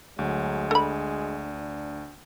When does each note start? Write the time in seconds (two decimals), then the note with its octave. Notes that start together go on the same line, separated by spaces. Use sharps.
0.19 D2 F#3 G#3
0.71 D4 A4 B5